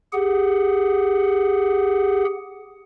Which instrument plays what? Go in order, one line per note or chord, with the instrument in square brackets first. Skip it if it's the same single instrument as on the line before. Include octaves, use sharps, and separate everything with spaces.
[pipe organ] G4 G#4 F#5